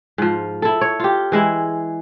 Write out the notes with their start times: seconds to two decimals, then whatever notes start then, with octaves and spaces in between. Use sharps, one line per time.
0.18 G#2 F3
0.62 E4 A4
0.81 C#5
1.00 F4 G4
1.32 E3 G#3 E4